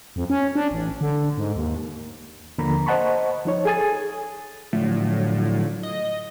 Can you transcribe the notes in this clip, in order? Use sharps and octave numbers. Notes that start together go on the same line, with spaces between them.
F2
C#4
D4
A1
D3
G#2
D#2
D#2 D3 F3 A#3 A#5 B5
C5 D#5 F#5 A5 B5 C#6
F3 D#4 C#5
G#4 A4 G#5 D#6 A6
A2 D3 F3 F#3
D#5